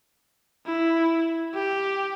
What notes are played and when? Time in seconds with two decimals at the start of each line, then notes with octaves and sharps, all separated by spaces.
0.66 E4
1.54 G4